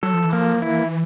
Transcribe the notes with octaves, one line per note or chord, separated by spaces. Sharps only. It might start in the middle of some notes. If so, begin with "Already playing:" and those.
F#3 A4
F3
E3
F3 A#3
E3 E4